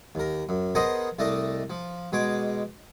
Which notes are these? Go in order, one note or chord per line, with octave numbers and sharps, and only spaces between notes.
D#2 A#4
F#2
B3 G#4 A#4 C5 D#5 F#5
C2 A3 D4 D5 D#5
F3
B2 G#3 C#5 D6